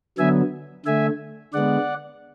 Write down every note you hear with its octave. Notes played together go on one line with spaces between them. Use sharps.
D3 F#3 B3 E5 G#5
D3 A3 E5 G#5
D3 G#3 B3 D5 F#5